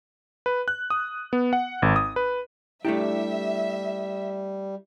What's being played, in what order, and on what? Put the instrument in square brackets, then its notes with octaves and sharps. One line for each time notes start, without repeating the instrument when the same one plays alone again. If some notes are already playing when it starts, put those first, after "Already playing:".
[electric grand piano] B4
F#6
D#6
B3
F#5
G#1
D#6
B4
[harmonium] G3 [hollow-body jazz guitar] A3 D4 G4 [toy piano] E4 [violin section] E5